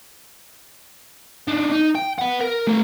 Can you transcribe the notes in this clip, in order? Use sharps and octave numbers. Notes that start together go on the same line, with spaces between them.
D4 D#4
D#4
G5
B4 F#5
A#4
A3 A#5